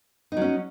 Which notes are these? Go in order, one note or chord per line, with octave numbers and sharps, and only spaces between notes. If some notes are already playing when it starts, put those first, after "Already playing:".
F#3 C#4 D#4